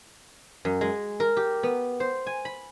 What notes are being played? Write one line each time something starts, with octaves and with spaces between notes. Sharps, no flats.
F#2
G#3
A#4
G4
B3
C5
G#5
B5